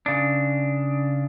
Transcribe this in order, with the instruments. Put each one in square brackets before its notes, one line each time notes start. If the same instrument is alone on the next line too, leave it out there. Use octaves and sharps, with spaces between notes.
[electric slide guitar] C#3 D4